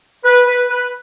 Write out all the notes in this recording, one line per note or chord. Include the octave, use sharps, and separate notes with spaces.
B4
B4
B4